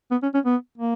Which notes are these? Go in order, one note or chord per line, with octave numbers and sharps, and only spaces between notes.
B3
C#4
C#4
B3
A#3